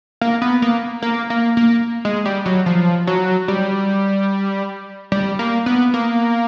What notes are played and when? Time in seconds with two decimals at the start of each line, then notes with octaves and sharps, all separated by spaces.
0.21 A#3
0.42 B3
0.62 A#3
1.02 A#3
1.30 A#3
1.57 A#3
2.05 G#3
2.25 G3
2.46 F#3
2.66 F3
3.07 F#3
3.48 G3
5.12 G3
5.39 A#3
5.66 B3
5.94 A#3